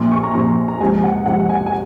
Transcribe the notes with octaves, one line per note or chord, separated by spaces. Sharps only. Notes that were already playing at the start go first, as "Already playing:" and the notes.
Already playing: A#1 A#2 F3 C6
C#6
A#5
A#1 A#2 F3 C6
A#5
C#2 C3 F3 G#5
F#5
C#2 C3 F3 F#5
G#5
G#5